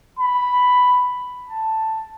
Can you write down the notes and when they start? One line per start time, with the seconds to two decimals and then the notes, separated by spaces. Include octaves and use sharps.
0.19 B5
1.48 A5